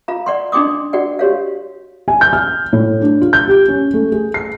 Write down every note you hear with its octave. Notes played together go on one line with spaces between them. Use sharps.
F4 F5 A#5
D5 F#5 C6
D4 D#4 G5 C6 D6 D#6
F#4 D5 F#5 G5
F#4 G4 C#5 F5
G#5
G6
F6
A2
D4
F4
G6
G4
C#4
A3
G#4
C7